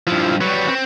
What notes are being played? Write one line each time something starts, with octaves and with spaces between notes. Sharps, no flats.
G2 F3 E4 F4
F#3 G3 B4 C#6
C4